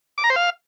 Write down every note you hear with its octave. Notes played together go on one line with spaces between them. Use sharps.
D6
A#5
C5
F5